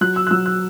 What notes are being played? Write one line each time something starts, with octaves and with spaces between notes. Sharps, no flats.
F#3 F#6
E6
F#6
F#3 E6
F#6